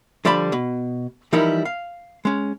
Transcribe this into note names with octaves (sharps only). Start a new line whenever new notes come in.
D3 F3 G3 D5 A5 B5
B2
E3 F3 G3 D#4 E4 A#4
F5
G#3 C#4